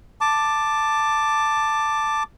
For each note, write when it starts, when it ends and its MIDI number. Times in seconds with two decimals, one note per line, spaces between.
0.21 2.23 81
0.21 2.23 86